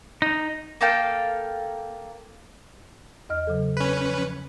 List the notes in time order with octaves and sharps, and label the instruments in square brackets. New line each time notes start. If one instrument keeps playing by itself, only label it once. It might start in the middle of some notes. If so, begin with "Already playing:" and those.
[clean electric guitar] D#4
[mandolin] A#3 A4 F5 G5
[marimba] E2 D#5 F6
C#3 F#3 A4
[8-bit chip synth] C#4 B4
[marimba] F3